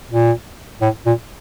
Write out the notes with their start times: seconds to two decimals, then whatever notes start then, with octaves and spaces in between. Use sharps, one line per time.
0.11 A#2
0.82 A2
1.06 A#2